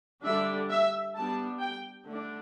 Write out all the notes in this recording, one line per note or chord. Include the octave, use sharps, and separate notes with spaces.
D3 G3 D4 E5
E5
G3 B3 D4 A5
G5
D3 A3 D4